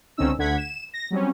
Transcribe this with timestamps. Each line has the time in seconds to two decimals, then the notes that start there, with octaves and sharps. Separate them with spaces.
0.17 C#2 D3 C4 C#4 D#4 E6
0.38 D2 D3 F#5 G#6 B6
0.58 E7
0.94 A#6
1.11 F#3 G3 C4 C#4